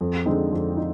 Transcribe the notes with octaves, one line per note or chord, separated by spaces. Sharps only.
F2
D3 G#3 C4 D#4
F2
D#4